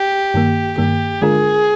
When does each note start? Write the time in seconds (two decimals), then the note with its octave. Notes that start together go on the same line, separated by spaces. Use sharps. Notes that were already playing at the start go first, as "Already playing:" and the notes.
Already playing: G4
0.34 G2 D#3 A#3
0.78 G2 D#3 A#3 G4
1.22 D3 G#3 D4 F4 G#4 A#4